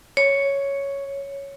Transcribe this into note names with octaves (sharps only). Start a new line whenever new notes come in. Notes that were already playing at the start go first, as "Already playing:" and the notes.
C#5